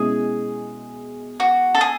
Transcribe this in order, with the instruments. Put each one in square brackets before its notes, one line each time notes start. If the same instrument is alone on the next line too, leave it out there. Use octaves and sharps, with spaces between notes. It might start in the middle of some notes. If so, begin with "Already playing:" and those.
Already playing: [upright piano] B2 G#3 C#4 E4 [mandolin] G#4
[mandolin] F#4
A4
G#4